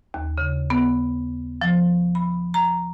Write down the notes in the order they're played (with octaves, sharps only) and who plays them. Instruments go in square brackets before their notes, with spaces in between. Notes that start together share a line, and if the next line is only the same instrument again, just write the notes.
[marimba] D#2
C#3
B3
F3
B5
A#5